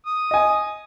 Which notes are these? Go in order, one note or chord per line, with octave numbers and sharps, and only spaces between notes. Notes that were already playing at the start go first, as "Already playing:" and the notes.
D#6
D#5 G#5